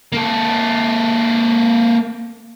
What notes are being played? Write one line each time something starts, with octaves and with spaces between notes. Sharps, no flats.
A#3 A4